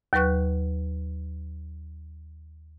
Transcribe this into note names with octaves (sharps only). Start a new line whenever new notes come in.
D#2 F#3 B4 C#6 F#6